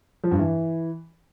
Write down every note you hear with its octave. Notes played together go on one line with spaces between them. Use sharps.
F3
G2
E3